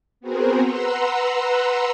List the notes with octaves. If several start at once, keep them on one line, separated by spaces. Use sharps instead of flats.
B3 C4 F#4 G#4 A#4 C5
B4 F#5 A#5 C6 E6